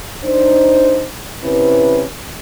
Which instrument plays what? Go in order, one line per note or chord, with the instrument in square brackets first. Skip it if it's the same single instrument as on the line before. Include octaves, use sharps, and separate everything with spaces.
[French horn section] D4 D#4 C5
C3 C#4 E4 B4